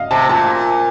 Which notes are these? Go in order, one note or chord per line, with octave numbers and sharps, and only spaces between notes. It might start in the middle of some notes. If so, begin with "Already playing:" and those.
Already playing: D#5 F5
C3 A5
A#2 A5